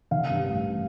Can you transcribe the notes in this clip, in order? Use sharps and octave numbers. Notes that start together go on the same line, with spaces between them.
D#3 F5
G2
A1